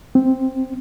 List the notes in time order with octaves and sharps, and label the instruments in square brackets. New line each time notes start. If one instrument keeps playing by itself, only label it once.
[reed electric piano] C4